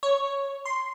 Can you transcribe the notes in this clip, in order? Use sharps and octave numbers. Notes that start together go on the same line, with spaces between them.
C#5
C6